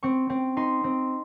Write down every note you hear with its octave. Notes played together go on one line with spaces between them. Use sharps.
C4 C#6
C4
D#4 C6
C4